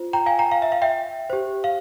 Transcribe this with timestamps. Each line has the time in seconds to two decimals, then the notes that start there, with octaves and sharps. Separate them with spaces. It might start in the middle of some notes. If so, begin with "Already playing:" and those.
Already playing: F4 C5
0.13 G5 A#5
0.26 F5 G#5
0.39 G5 A#5
0.51 F5
0.62 E5
0.72 F5
0.82 E5 G5
1.30 G4 C5
1.64 F5